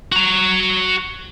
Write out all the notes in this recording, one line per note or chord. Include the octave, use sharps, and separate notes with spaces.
F#4 A#5